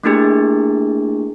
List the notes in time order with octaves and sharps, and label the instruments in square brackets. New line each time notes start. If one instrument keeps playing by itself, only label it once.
[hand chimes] A3 A#3 D4 E4 G4 G#4